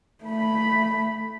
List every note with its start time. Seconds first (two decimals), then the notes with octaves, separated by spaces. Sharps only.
0.24 A3 B5